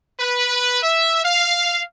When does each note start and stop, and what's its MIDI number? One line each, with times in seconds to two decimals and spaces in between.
0.20 0.81 71
0.82 1.24 76
1.24 1.82 77